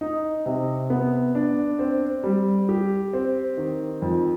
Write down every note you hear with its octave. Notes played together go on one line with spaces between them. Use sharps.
D#4
C3
B3
D4
C4
G3
G4
C4
D#3
F2